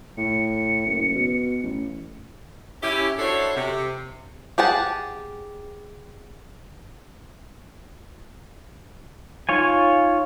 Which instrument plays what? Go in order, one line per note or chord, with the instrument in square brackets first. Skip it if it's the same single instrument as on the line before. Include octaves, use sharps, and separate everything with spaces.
[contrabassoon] A2 [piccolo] C#7
[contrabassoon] F#1
B2
A1
[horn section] C#4 E4 G4
D4 E4 F#4 A4 C5 C#5
C3
[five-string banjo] G4 G#4 F#5 A5
[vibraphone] D#4 [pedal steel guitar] F4 C#5 G#5